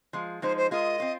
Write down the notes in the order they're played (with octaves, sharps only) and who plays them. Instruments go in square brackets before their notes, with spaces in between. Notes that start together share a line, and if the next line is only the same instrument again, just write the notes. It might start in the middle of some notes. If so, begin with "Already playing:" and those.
[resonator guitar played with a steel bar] F3 G#3 F4
[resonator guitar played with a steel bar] F3 G#3 D#4 [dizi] C5
[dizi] C5
[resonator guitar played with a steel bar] G#3 F4 A#4 [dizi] D#5
[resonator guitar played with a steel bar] C4 F4